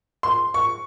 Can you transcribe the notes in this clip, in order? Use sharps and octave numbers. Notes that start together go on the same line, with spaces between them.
C6
C#6